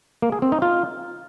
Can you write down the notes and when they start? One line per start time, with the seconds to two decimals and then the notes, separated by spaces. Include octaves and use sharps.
0.22 A#3
0.32 G#4
0.42 C4
0.52 D#4
0.62 F4